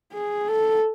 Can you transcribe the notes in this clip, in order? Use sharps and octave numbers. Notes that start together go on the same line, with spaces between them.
G#4
A4